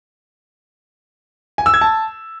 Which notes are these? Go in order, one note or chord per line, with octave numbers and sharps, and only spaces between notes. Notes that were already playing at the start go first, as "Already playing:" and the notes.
G#5
E6
G#6
A5